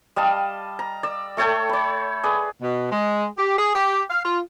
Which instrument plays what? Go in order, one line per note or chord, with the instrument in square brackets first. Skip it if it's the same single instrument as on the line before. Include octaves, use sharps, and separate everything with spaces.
[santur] G3 D#5 F5 A5
A#5
D5 E6
A3 A4 C#5 G5
C#5 B5
G#4 B4 D5
[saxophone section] B2
G#3
G4
G#4
G4
F5
F4